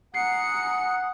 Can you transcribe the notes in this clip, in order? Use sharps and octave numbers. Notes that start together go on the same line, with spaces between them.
F#5 G#5 A#5 D#6 C7 C#7